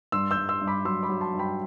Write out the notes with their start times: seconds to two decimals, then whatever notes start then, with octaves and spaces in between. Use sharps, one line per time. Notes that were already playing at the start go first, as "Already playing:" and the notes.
0.12 G2 C6 E6
0.31 E6 G6
0.37 G2
0.49 C6 E6
0.61 G2
0.67 B5 D6
0.85 F#3 C6 E6
1.03 B5 D6
1.09 F#3
1.21 A5 C6
1.33 G2
1.39 G5 B5